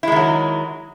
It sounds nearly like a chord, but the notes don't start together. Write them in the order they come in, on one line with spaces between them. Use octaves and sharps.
E4 G#3 D#3 F#3